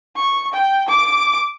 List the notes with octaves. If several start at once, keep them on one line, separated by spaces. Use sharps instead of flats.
C#6
G5
D6